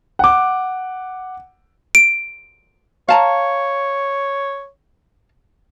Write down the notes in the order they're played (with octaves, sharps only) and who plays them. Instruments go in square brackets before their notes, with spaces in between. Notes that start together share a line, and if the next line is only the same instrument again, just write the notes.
[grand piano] F#5 D6
[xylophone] D7
[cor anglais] C#5 [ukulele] F5 A5 A#5